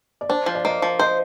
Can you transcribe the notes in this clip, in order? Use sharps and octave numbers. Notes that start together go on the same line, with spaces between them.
D5
D4 C5
F3
D5
A#3 D#5
F3
C5 D#5